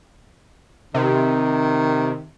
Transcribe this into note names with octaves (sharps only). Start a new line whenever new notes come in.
C3 D#3